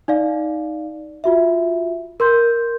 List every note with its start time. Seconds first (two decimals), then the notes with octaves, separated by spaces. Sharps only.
0.08 D#4 D5 F5
1.24 F4 F#4 E5
2.20 A#4 C6 G6